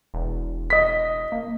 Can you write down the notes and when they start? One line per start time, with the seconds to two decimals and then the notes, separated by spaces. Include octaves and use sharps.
0.14 E1
0.70 D#5 B6
1.32 A#3